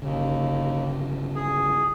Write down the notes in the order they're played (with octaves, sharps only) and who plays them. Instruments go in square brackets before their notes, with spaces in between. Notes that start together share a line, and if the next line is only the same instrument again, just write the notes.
[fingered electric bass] G1 C#3 [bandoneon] D#2
[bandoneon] G#4